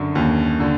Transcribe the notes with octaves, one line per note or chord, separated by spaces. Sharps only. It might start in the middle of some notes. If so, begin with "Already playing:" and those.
Already playing: F#2 D3 F#3
D#2
D3